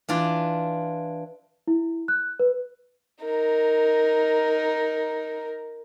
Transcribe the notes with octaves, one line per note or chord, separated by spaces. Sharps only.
E3 D4 F4
E4
F#6
B4
D#4 A#4